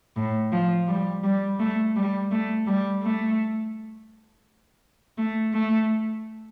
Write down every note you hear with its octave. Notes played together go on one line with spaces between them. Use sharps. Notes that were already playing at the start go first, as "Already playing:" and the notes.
A2
F3
G3
G3
A3
G3
A3
G3
A3
A3
A3